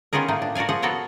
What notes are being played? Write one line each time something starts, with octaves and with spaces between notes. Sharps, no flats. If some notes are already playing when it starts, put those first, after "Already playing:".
D#3 B3 C#4 F4 G#4 A#4
A2 A#3 D#4
D4
F#4 A#4 D5 F5 G#5
F3 G#4 F#5
B3 F#4 A4 A#4 C#5